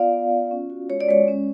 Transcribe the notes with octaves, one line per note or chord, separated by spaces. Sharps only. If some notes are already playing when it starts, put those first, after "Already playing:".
Already playing: B3 F4 D5 F5
B3
F4
C#4
F#4
G#3 C#5
D5
G#3 C#5
C#4